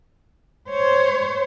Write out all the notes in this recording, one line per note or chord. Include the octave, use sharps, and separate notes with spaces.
C5 C#5